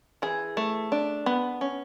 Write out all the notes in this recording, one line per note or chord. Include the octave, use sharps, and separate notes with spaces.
E3 G#4
A3
D4
B3
C#4